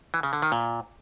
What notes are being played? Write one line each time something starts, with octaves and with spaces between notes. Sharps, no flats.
E3
C#3
D3
D#3
A#2